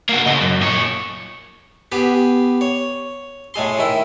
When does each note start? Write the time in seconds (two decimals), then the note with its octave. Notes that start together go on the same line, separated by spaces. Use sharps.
0.09 A#3 F#4
0.26 C#3 D#5
0.40 F#2
0.61 A#2 C#5
1.92 B3 G4 G#4
2.61 C#5
3.54 A2 G#3 G#4 C6
3.79 D#3 E4